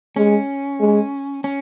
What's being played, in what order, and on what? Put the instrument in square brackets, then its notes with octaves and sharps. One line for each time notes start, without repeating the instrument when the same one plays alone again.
[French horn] G#3 [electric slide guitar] C#4
[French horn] G#3
[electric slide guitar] C#4